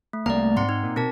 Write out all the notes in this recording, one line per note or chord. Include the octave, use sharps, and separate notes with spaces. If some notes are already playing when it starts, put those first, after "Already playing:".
A3
C2 A3 A#3 D5 A#5
G#2 C4 F#5 C6
D#4
A#2
B2 C4 A#4 A5